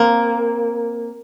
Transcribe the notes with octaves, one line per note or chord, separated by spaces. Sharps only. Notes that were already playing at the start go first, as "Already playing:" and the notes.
Already playing: A#3 C4